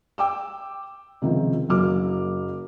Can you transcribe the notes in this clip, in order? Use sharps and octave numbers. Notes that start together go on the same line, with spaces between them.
G5 D6 E6
C#2 C3 D#3 F3
F#1 F#3 A#3 D6 F6